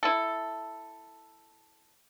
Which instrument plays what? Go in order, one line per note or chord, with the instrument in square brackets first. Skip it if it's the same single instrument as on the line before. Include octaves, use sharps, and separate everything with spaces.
[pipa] E4 A4